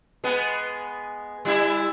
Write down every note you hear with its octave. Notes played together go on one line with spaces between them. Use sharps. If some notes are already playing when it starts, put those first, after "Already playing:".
G#3 B3
G3 E4